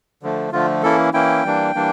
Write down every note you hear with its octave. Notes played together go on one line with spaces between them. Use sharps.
D3 F3 A3
D3 F3 A3 F4
E3 A#3 C#4 E4 A4
E3 A#3 C#4 E4 G5
E3 G3 A#3 D4
E3 G3 A#3 D4